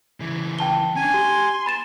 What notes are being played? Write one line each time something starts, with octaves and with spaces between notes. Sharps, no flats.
C#3 E3
G5 A5 G7
C#4 D4 G#5
G4 C6
B5 A6 E7